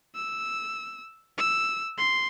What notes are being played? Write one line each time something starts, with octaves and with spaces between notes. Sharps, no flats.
E6
E6
C6